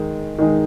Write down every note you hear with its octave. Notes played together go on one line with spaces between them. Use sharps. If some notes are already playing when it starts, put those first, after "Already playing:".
Already playing: D#3 G#3 D#4
D#3 G#3 D#4